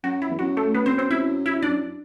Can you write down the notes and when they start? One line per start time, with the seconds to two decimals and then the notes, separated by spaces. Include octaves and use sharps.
0.04 F#2 F#4
0.22 E4
0.30 E2
0.39 F#2 F#4
0.57 A3 A4
0.74 B3 B4
0.86 C4 C5
0.98 C4 C5
1.11 E4 E5
1.46 E4 E5
1.62 D4 D5
1.69 F#2